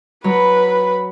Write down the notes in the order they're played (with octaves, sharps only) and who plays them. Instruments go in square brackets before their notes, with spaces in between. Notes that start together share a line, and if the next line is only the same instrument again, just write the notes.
[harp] F#3 [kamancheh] B4 B5